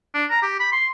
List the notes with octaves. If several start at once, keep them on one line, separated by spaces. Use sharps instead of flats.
D4
A#5
G4
B5
C6